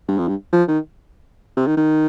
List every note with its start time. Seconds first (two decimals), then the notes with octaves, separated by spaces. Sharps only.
0.08 G2
0.18 F2
0.28 G2
0.53 F3
0.68 D#3
1.57 C3
1.67 D#3
1.77 D#3